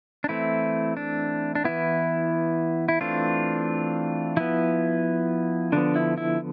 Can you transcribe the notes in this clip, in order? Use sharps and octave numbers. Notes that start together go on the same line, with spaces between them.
D4
E3 A3 C4 E4
D4
D4
E3 B3 E4
E4
E3 A3 C4 D4 F4
F3 B3 E4
D3 F3 B3 D4
E4
E4